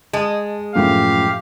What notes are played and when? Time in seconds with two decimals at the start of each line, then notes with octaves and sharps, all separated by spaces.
0.13 G#3 A5
0.75 F#2 A2 F3 G4 F5